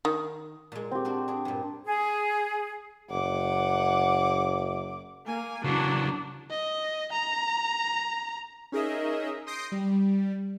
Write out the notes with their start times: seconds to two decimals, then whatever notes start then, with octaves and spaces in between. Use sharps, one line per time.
0.05 D#3
0.72 A#2 G#3
0.91 C4 G4
1.05 D4 F#4 C5
1.28 D4 G#4
1.45 G2 A#2
1.86 G#4
3.10 F#1 F#5 D6
5.27 A#3 G#5
5.64 C#3 E3 F#3 D4
6.50 D#5
7.12 A#5
8.72 C#4 D#4 G#4 A#4 D#5 E5
9.47 C6 D#6 G6 A#6 C7 D7
9.72 G3